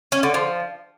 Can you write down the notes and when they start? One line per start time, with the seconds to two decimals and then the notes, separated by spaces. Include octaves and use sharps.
0.12 C#4
0.23 D3
0.34 F3